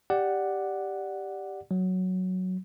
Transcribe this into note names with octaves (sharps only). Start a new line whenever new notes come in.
G4 D5 F#5
F#3